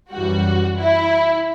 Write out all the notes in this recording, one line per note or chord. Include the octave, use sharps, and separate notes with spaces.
F#2 E3 G3 F#4
E4